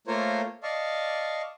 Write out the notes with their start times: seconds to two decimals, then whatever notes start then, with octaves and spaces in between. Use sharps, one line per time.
0.07 A3 A#3 F4 A#4 C5 C#5
0.63 D5 D#5 F5 A5 C#6